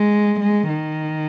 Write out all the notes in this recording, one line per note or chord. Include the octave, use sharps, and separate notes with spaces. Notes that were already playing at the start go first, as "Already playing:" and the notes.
Already playing: G#3
G#3
D#3